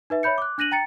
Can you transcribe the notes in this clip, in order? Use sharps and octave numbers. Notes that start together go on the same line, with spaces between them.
D#4 B4 E5
C#5 E5 B5 G6 C#7
D6 F#6
D4 F#6 A#6 D#7 F#7
G5 A#5 A6 C#7